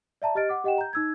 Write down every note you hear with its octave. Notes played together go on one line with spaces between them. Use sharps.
D5 E5 A5 A#5
G4 D#5 F6 A6 D7
F#5 D6
G4 D#5 F#5 G5 E7
A#5 G6
D#4 E6 G#6